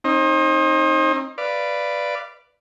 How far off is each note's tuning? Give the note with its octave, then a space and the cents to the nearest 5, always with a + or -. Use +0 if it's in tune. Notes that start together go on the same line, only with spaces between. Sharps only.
C4 +40 D#4 +0
B4 +0 D5 +0 F5 -25